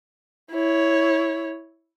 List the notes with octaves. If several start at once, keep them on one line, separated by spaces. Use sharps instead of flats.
E4 C#5